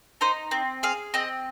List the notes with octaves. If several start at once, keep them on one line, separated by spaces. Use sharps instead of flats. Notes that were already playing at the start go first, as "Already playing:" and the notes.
D#4 C5
C4
G#4 F5
C4 D#5